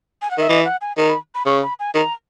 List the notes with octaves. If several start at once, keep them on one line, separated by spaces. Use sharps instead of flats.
G#5
F#5
D#3 E5
E3 D#5
F#5
G#5
D#3 A#5
B5
B5
C#3 C#6
B5
G#5
D#3 A#5